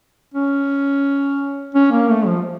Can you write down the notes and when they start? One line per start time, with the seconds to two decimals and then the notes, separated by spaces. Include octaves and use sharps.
0.34 C#4
1.75 C#4
1.91 A#3
2.10 A3
2.27 F3